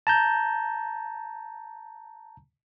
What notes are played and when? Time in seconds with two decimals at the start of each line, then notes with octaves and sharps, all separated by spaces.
0.07 A5 A#5 G6